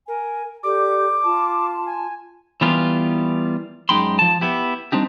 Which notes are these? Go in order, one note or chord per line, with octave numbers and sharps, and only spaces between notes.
A#4 G#5
G4 A4 D5 D6
F4 A5
G#5
E3 G3 B3 F4 G4 A#4
F#2 G#3 D#4 G5 B5 C6
F3 A5
B3 E4 G4
G3 C4 D4 D#4 G4